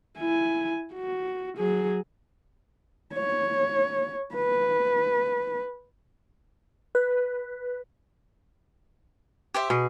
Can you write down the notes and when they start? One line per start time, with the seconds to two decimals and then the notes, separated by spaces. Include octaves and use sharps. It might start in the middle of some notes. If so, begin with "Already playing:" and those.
0.18 E4 G#5
0.94 F#4
1.58 F#3 G#4
3.14 C#5
4.35 B4
6.95 B4
9.54 G4 C5 E5
9.70 B2 G#4